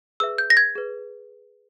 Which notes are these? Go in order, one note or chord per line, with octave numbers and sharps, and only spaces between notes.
G#4 B4 E5 E6
G6
A#6
G#6
G#4 B4